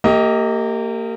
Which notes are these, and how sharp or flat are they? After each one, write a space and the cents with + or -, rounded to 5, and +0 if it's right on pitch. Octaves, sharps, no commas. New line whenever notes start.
A#3 -30 G4 +0 D#5 +20